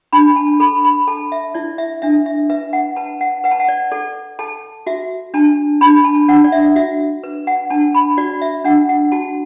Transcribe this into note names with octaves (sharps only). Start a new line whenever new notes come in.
D4 B5
A5
A4 B5
B5
A4 A5
E5
E4 D5
E5
D4 E5
E5
B4 E5
F#5
B4 A5
F#5
B4 F#5
A5
F#5
D5
A4 D5
A4 A5
F#4 E5
D4 A5
D4 B5
A5
D4 F#5
D5
E5
F#4 E5
B4
F#5
D4 A5
B5
F#4 D5
E5
D4 F#5
F#5
F#4 A5